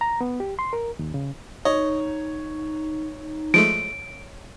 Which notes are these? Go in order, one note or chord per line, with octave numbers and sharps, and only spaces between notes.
A#5
B3
G4
C6
A#4
D#2
C#3
D#4 C#5 D#5
F3 G#3 A3 D7